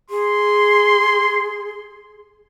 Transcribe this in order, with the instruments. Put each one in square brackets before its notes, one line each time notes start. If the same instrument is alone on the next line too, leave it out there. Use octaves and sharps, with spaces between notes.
[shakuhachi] G#4 [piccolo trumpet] C6